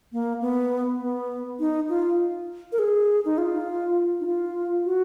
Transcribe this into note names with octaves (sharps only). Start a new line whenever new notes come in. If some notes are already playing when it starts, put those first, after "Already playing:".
A#3
B3
B3
D#4
F4
A#4
G#4
D#4
F4
D#4
F4
F#4